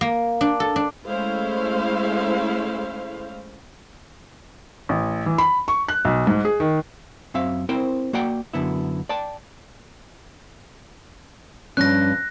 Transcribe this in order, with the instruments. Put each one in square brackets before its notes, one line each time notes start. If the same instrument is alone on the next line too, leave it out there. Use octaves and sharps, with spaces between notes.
[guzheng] A#3
D4
A4
D4
[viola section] G#3 A3 C#4 E4 C5 F5
[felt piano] A1
E3
B5
C#6
F#6
B1
G#2
G#4
D#3
[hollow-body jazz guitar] F#2 C4 E5 F5
C4 E4 A#4 C5 G5
A#3 F#4 D5 F#5 G5
F#2 D3 B3 E4
D5 G5 A5
[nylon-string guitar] G2 F3 C#4 [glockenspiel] F#6 A#6